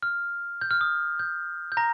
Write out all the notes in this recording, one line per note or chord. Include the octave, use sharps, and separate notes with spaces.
F6
G6
F6
D#6
G6
G6
A#5 A#6